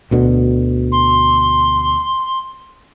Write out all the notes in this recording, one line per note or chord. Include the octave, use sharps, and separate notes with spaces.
D2 B2 D3
C6